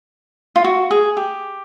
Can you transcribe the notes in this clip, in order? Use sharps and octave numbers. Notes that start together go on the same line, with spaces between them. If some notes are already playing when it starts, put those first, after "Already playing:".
F4
F#4
G#4
G4